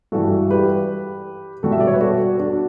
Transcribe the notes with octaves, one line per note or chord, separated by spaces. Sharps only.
G2 E3 G3 F#4 A4
G4 B4
B2 G3 F#4 A4
E5
D5
C#5
B4
F#4 A4
D4 F#4